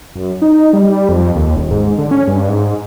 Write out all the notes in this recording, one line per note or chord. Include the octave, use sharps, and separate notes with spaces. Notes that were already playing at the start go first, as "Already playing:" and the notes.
F#2
D#4
G3
F2
D#2
D#1
G#2
D3
C#4
G2
G#2